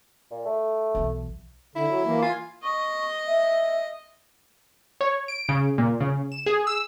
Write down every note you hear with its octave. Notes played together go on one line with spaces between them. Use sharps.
A#2
A3
B1 E3
D3 E4
F#3
E3 A#3
F4 G#5
D#5 C#6
E5
C#5
D7
C#3
A#2
C#3
E7
G#4
E6